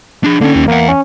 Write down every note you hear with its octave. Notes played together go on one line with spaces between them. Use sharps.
D4 G#4
D3 A#3 C#4
D#2
E2 A#3 F#5
C#4